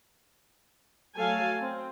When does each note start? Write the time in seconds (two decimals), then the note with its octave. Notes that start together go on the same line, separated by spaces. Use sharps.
1.16 F#3 A3 A4 F5 G#5
1.61 C4